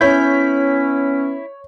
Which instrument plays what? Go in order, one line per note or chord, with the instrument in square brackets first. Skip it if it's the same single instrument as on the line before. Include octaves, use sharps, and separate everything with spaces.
[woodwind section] B3 C#4 [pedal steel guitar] E4 [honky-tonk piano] C#5 G6